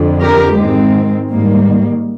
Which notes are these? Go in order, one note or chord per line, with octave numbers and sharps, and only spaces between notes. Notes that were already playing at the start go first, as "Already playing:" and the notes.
Already playing: F2 D3
G4 A#4
G#2 D#3 G#3 C4
G#2 D#3 G3 A#3